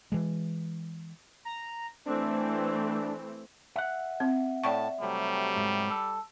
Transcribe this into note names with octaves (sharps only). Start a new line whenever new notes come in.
E3 G#3
A#5
E3 A3 C4 D4
E5 F#5
C4
A2 D5 G5 A5 C#6
C3 F#3 G3 A3
G#2
A4